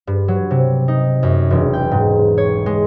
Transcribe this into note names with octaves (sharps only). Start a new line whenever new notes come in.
G2
F#3
C3
D#4
F#2
E1
G5
G#2
C#5
G#3